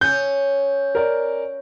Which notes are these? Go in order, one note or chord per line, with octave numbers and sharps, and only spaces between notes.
C#4 G6
A#4 D5